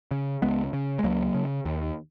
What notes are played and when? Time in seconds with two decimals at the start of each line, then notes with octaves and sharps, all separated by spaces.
0.11 C#3
0.42 C#2 G#3 B3
0.73 C#3
0.99 G#3
1.04 C#2 F#3 A#3
1.34 C#3
1.65 D#2